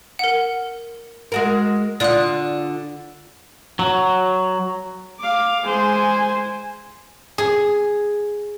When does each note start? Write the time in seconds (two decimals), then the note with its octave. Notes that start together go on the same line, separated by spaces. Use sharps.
0.19 A#4 F#5
1.32 G#3 F#4 A#4
2.00 D3 F4 D5 D#6 F#6
3.79 F#3
5.19 F5 D6
5.66 G#3 C5 G#5
7.38 G#4